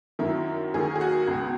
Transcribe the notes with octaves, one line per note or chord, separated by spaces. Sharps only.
F#2 D#3 E4
D#2 D#3 G#4
G#4
F#4
C#2 B2